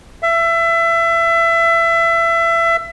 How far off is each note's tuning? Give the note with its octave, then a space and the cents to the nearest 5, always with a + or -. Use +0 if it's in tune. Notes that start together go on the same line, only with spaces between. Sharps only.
E5 +25